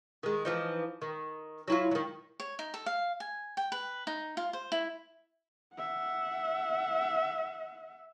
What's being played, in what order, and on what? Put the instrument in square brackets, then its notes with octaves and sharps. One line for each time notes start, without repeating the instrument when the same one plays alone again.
[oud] D#3 G#3
E3 F3 D#4
D#3
F#3 E4 F4
D#3 F#3
[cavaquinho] C#5
D#4
A4
F5
G#5
G5
B4
D#4
F4
C5
E4
[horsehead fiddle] E5 F#5